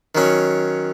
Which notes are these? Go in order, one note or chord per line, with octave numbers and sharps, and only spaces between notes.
D#3 F#3 C#4